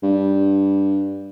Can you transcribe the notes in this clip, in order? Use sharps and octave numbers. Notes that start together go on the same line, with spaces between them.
G2